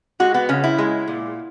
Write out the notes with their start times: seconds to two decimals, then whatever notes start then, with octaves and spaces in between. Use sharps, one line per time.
0.20 G#3 F#4
0.34 B3
0.49 C#3 C#4
0.64 E4
0.78 G#3
1.08 A#2